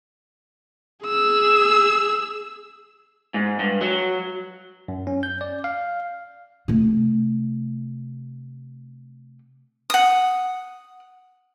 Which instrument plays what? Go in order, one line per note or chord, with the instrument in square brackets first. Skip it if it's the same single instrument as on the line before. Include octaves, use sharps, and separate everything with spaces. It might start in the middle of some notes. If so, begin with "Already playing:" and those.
[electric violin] G#4 E6
[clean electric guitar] G#2
G2
F#3
[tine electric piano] F#2
C#4
G6
D5
F5
[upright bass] C3 A3
[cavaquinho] F#5 D#6